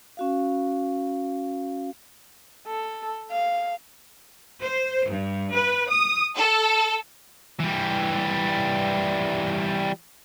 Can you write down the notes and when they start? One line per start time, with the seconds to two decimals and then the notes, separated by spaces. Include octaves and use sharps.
0.17 C#4 F#4 F5
2.67 A4
3.31 F5
4.62 C5
5.08 G2
5.54 B4
5.90 D#6
6.36 A4
7.60 E3 G3